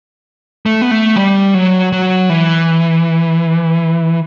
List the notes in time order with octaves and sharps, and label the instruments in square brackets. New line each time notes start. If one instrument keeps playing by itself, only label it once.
[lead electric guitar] A3
B3
A3
G3
F#3
F#3
E3